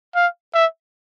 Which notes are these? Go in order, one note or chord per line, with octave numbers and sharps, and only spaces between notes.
F5
E5